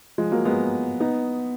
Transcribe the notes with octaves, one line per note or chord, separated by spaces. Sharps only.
F3 G#3
F#3 A#3
G#3 B3
B3 D#4